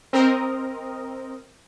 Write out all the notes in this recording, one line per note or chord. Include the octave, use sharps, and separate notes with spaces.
C4 A#4 D#5